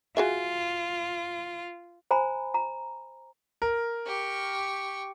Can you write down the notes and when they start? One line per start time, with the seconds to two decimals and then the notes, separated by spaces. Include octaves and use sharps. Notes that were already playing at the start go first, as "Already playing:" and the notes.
0.17 F4 F#4 G#4 E5
2.11 C5 G#5 A#5 B5
2.54 A#5
3.62 A#4
4.06 G4 C#6